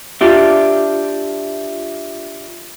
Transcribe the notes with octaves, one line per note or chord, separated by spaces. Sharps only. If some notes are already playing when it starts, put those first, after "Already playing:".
D4 F4 G4 E5